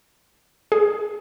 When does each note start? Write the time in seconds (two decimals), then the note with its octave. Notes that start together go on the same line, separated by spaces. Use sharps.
0.72 G#4